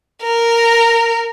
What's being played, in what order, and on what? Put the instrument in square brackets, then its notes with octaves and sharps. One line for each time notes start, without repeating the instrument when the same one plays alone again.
[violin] A#4